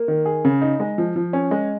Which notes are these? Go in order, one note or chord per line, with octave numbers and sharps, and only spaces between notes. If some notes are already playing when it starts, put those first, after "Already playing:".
Already playing: A#3
D#3
G#4
C#3
D#4
G#3
F3
F3
C#4
G#3